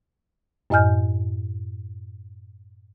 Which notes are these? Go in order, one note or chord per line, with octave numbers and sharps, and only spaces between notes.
F#2 A2 D#5 G#5 F6 G6